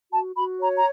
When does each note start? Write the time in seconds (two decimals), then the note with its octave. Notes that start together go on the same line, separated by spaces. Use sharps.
0.11 F#4 A5
0.35 F#4 B5
0.60 C#5 A#5
0.75 A#5